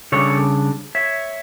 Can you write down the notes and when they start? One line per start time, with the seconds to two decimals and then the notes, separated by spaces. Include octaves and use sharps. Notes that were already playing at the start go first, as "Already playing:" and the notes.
0.12 C#3 G3 D4 A4 C#5
0.95 C#5 E5